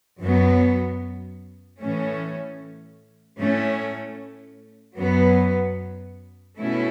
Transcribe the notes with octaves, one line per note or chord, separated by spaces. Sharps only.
F#2 F#3 B3
A2 E3 A3 C#4
A2 A3 C#4
F#2 F#3 B3
B2 A3 C#4 E4